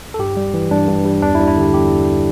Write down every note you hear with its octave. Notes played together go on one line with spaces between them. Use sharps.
A4
G2 G4
G3
E3
G2 D4
G2
G3
E2 D4
E4
G3
E4
D3 G4
A4
E2 G4